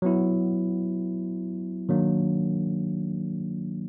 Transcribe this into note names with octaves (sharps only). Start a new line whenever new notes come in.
F#3 B3 E4
D#3 F#3 A#3 D4